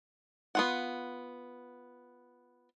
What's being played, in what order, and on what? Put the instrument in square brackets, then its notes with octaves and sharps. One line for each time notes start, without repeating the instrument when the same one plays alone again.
[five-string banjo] B3 F4 F#5